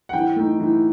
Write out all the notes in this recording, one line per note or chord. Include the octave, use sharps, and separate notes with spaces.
F#5
E3 G5
A3 D#4
E3